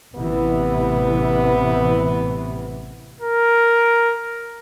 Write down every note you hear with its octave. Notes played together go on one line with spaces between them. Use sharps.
A1 C3 E3 B3
A#4